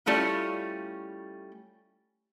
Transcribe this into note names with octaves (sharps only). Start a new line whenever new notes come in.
G3 A3 C#4 E4 F4